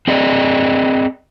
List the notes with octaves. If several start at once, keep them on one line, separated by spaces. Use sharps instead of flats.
C4 G#4 D5 D#5